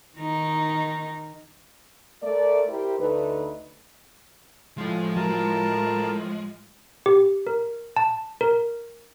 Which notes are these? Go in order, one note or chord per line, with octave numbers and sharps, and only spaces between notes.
D#3 D#4
A3 A#4 D5
E4 G4 A#4 C5
D2 D3 A3 D#4 B4
A2 F3 G#3 F4
F#3 A#4 A5
G4
A#4
A5
A#4